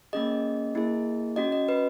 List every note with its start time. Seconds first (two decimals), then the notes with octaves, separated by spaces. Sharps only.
0.13 A#3 C#4 G#4 D#5
0.75 A#3 E4 G#4
1.36 C#4 F#4 D#5
1.52 D#5
1.68 B4